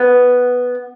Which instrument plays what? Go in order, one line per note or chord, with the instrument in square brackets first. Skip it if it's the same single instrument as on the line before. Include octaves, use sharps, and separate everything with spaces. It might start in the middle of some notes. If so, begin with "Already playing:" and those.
Already playing: [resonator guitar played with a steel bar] B3